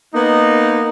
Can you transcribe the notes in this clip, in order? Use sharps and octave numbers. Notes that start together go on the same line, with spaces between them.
A#3 B3 D#4